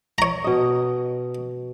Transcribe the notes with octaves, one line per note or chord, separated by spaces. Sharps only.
C#5 A#5
B2 D#5